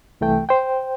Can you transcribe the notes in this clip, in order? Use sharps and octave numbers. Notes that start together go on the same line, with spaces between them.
C2 E3 A3 G5
C5 G5